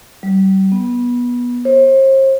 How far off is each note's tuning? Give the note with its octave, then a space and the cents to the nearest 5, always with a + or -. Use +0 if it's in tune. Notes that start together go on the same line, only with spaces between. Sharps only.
G3 -35
B3 -20
C5 +40